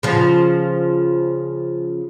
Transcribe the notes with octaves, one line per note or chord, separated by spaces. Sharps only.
C#3 F3